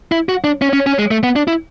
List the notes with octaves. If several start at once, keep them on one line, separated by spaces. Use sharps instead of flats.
E4
F#4
D4
C#4
C#4
C#4
G#3
A3
B3
D4
E4